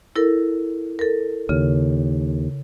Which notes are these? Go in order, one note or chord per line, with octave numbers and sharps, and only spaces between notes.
E4 A4 A#4
A4 A#4
D#2 C#3